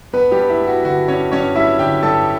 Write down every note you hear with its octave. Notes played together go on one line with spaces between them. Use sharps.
G2 B3 B4
G3 G4
G2
E4
G3
F#4
D3 F#4
G2 C#4 C#5
G2 C#4 C#5
G3 E4 E5
D3 G4 G5
G2 A4 A5